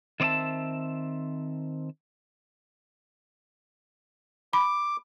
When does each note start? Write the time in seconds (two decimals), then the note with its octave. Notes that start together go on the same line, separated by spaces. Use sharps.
0.20 D#3 C4 D5 E5 A5
4.53 B5 D6